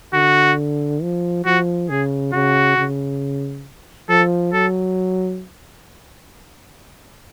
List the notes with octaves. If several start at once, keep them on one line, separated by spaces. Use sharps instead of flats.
D3 F#4
F3
F3 F#4
C#3 G#4
C#3 F#4
C#3
F3 A4
F#3 A4